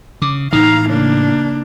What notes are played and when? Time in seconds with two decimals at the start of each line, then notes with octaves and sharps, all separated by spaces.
0.22 C#3 D6
0.53 A2 E3 D#4 F5 A#5
0.90 C#3 A#3 D4